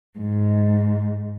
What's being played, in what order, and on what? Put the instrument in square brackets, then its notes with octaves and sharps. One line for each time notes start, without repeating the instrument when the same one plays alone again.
[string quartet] G#2